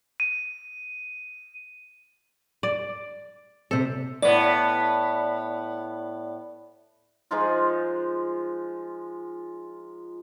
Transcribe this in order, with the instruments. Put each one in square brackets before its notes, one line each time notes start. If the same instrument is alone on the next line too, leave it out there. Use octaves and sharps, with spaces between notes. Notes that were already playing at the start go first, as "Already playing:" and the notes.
[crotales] D#7
[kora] D5
[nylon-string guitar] C3 C4 [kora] A4
[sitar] A2 B3 [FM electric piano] D5
[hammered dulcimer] F3 G#3 D#4 F4